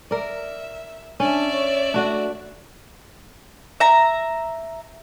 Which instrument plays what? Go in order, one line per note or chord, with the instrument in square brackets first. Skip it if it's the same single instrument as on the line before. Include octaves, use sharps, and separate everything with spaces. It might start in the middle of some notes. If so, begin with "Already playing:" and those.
[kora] A#4 D5 [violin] E5
[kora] C#4 [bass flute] D4 [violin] D5 E5
[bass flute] C#5
[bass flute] A3 [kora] D4 F#4
[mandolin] E5 A#5